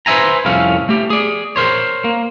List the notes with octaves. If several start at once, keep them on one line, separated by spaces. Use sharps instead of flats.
B4 C5 D#5 E5 G#5 A#5
C2 F2 A2 A3 C#4 F5
A3 G4
G#4 D5
A#4 C5 C#5
A#3